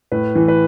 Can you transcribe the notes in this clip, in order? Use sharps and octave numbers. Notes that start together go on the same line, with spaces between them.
A2 B4
E3
B4